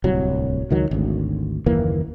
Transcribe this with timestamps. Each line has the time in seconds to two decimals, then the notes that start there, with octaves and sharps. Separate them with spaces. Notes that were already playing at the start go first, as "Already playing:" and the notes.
0.04 D1 C2 F#3
0.71 C#2 D#3 F#3
0.91 G#1 D2
1.66 F#1 D#2 E3 A#3